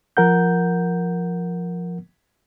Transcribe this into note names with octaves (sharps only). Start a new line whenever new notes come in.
F3 A#4 F#5 G6